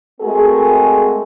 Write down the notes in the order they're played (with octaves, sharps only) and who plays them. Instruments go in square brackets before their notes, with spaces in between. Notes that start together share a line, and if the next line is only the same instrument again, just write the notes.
[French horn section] G#3 A3 C4 F#4 G#4 A#4